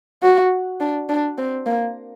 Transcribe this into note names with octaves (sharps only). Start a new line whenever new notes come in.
F#4
D4
D4
C4
A#3